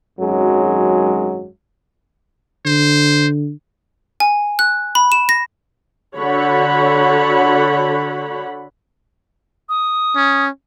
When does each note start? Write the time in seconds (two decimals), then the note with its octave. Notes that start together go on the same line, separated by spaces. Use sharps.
0.19 G#1 F#2 F#3 G#3
2.65 D3 C5
4.20 G#5
4.59 F#6
4.95 B5
5.12 E7
5.29 A#6
6.16 D3 F#4 A4 C#5 F#5 B5
9.69 D#6
10.16 C#4